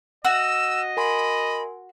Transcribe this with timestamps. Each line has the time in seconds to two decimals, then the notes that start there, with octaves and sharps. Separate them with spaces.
0.25 F#4 D#5 E6
0.97 A#4 G#5 B5 C6